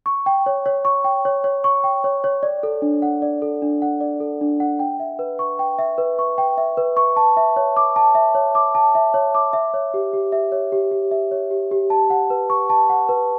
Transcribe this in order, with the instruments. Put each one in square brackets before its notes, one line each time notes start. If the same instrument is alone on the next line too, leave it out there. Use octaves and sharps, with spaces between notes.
[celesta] C#6
G5
C#5
C#5
C#6
G5
C#5
C#5
C#6
G5
C#5
C#5
D5
A4
D4
F#5
D5
A4
D4
F#5
D5
A4
D4
F#5
G5
E5
B4
C#6
G5
E5
B4
C#6
G5
E5
B4
C#6
A5
E5
C#5
D6
A5
E5
C#5
D6
A5
E5
C#5
D6
E5
C#5
G4
G4
E5
C#5
G4
G4
E5
C#5
G4
G4
A5
F#5
B4
C#6
A5
F#5
B4